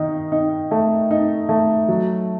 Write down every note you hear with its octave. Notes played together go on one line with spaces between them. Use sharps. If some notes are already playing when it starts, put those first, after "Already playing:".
Already playing: D#3 D#4
D#4
A3
D#4
A3
F#3